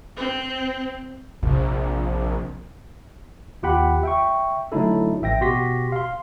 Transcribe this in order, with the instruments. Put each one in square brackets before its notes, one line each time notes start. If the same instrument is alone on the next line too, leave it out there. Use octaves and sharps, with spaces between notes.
[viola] C4
[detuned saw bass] A#1 [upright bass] C3
[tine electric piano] D#2 F4 G4 F#5 G5 B5
E5 G5 C#6
D3 F#3 A3 D#4 E4 A4
A1 E5 G5 A#6
B2 F#4 G4 C6 A#6 B6
F5 C6